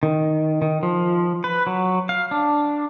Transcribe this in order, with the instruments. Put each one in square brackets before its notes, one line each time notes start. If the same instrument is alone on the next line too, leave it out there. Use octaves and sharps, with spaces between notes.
[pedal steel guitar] D#3
D#3
F3
B4
F#3
F5
D4